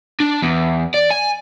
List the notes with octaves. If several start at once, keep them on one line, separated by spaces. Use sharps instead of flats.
D4
E2
D5
G#5